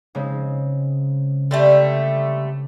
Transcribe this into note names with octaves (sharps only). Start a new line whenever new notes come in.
C#3 G#3 C4
D3 G3 A3